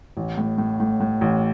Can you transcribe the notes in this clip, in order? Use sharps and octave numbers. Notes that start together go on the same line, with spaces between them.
A1
A2
A2
A2
A2
A1